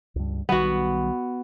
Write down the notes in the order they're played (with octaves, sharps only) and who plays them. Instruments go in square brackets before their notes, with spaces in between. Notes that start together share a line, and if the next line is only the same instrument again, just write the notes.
[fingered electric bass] C#2 G2
[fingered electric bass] B1 D#3 G3 [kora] B3 F#4